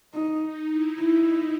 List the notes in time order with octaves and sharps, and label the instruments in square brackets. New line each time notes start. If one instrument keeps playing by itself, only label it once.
[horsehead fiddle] D#4
[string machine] D#4
E4
[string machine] D#4 [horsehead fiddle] E4